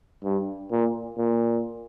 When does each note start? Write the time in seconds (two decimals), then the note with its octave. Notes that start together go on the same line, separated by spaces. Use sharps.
0.24 G2
0.71 A#2
1.18 A#2